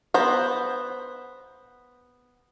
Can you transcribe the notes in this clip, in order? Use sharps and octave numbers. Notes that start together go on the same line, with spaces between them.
B3 C5 A#5